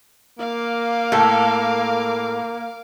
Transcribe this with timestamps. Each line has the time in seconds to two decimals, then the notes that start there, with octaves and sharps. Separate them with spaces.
0.39 A#3 F5 D6
1.12 A2 A4